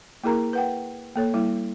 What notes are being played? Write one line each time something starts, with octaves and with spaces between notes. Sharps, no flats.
A#3 E4 G#4 A#4 A#5
B4 F#5 G5
A#3 A4 C#5
G3 A#3 E4